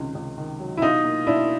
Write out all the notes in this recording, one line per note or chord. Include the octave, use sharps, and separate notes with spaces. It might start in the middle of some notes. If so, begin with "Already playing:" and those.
Already playing: C#2 C3 D#3
C#2
D#3
F#3
E4
B2 D#4 F4
A#3
B2 D4 E4